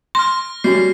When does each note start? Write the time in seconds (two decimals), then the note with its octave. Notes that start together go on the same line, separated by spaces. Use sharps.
0.15 C6 F6 A#6
0.64 G3 C#4 F#4 C7